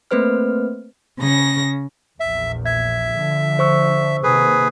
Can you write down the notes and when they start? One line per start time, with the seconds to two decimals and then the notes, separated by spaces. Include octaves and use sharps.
0.11 A3 A#3 C4 B4 C5 F6
1.19 C#3 A#6
2.20 A#1 E2 E5
2.66 E5 G#6
3.15 D3 F3
3.59 C5 C#6 E6
4.23 C3 D#3 A#3 G#4 B4